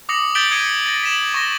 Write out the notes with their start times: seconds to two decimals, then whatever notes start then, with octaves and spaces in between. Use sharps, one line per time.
0.09 D6 D#6 A#6 C#7 F#7
0.35 G6 A6 B6 D7 F#7 G7
0.51 D#6 G#6 B6 C#7 D#7 G7
0.86 A6 A#6 G7
1.03 B6 E7 F#7
1.34 C#6 A#6 G7